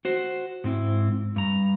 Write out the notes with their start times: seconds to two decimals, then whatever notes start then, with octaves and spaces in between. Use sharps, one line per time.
0.05 F#4 C5
0.64 G#2 C4 E4
1.36 G2 A#5